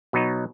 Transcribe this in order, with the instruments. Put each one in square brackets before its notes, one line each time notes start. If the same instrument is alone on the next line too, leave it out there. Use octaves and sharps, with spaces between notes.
[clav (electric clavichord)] B2 F#3 B3 D#4